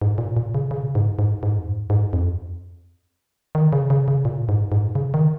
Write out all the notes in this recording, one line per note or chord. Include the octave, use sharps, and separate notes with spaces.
G#2
A#2
A#2
C#3
C#3
A#2
G#2
G#2
G#2
F2
G#2
G#2
F2
D#3
C#3
C#3
C#3
A#2
G#2
G#2
A#2
C#3
D#3